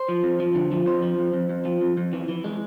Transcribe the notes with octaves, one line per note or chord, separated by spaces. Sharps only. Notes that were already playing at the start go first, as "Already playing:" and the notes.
Already playing: C5
F3
F2
F3
D3
F3
F2 C5
F3
F2
F2
F2
F3
F2
F2
E3
E3
G#3